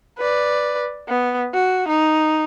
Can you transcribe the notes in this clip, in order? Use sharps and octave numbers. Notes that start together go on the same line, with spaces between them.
B4 D5
B3
F#4
D#4